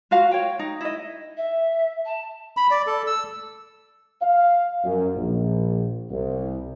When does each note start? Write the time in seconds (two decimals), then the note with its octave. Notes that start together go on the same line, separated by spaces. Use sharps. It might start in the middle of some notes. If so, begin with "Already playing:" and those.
0.11 F4 F#4 F5
0.31 C#5 G5
0.59 D#4
0.81 E4 D#5
1.37 E5
2.05 A5
2.57 B5
2.71 D5
2.87 A4
3.07 E6
4.22 F5
4.84 F#2
5.15 A#1
6.10 C2